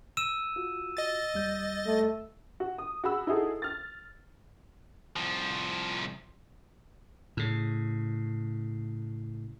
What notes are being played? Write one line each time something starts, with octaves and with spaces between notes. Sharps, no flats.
E6 D#7 E7
F4 F#4
D#5 A6
D#2 G3 G6
A3
F#4
D#6
F#4 G#4 B5 E6
D#4 E4 F#4 G#4 A4
F6 A6
C2 F3
A2 C#3